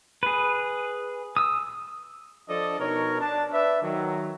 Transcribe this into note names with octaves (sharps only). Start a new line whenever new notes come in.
G#4 B4
D#6 E6
F3 D4 A4 D5 D#5
B2 D#4 A#4 C#5
D4 A5
B4 D5 E5
D#3 F#3